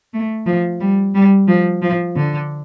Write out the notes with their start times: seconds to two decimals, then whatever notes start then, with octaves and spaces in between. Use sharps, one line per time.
0.14 A3
0.46 F3
0.80 G3
1.15 G3
1.48 F3
1.82 F3
2.16 D3